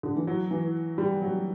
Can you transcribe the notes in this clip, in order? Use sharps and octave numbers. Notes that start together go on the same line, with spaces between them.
D3
E3
F#3
E3
G3
F#3